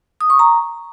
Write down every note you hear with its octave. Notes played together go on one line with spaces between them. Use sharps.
D#6
C#6
A#5